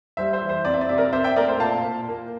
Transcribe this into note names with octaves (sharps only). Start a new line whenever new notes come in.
G3 C5 E5
C5 E5
E3
C5
C4 D5
E5
D5
C3 E5
A#4 D5
C4 C5 E5
E5 G5
A3 A#4 D5
C5
A#2 F5 A5
A#2
A#3